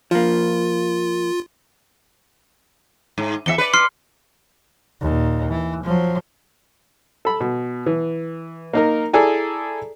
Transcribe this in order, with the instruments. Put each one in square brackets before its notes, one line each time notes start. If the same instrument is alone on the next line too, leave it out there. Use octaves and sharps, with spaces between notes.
[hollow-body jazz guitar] F3 A#3 [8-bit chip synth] F4
[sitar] G#2
[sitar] E2 C4 E5 [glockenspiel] C#7 G7
[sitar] B4 D5
[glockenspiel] C6 F6 C7
[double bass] D#2 A#2
E3
F3 F#3
[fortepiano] A4 B5
B2
E3
A#3 D#4 A#4
E4 G#4 A4 D5 G#5 A#5